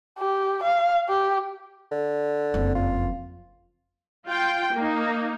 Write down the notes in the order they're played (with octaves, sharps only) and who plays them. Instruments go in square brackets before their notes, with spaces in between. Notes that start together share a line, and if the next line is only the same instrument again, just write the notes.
[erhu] G4
F5
G4
[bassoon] D3
[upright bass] F#1 F2
[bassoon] F4
[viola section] F4 G5
A#3 D#4